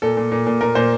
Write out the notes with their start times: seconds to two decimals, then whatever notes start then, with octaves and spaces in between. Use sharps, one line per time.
0.02 A#2 A4
0.17 A#2
0.32 A#2
0.47 A#2
0.61 A#2 A#4
0.75 A#2 C5